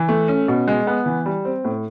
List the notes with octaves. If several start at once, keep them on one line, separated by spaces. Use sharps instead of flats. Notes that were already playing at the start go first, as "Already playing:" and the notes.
Already playing: E3
A3
C#4
B2
G#3
B3
E3
G3
C4
A2